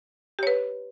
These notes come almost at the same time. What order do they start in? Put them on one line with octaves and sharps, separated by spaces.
G4 C#5 B4